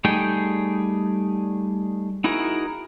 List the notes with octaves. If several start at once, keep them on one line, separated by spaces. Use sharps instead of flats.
G3 A3 D#4 G#4 G5
D#4 E4 F#4 G#4 A#4